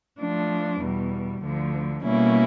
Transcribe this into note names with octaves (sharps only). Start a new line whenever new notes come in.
F3 A3 D4
E2 B2 G3
D2 D3 F3
B2 G3 A#3 C#4 E4